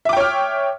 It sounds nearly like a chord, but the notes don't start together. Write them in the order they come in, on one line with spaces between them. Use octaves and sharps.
E5 D6 G5 C#5 F6